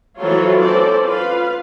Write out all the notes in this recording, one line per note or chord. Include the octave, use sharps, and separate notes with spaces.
E3 F#3 F4 A4 C5 C#5
C4 C#4 A4 C5 D5
F4 B4 F5